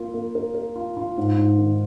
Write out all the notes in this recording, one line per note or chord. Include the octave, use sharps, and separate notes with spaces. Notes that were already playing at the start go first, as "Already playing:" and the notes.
Already playing: A#3 F4
A#3
A#4
A#4
F4
F4
G#2
G#2
D#3